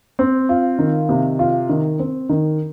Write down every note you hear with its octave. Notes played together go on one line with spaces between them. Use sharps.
C4
F4
D#3
C3
F4
D#3
C4
D#3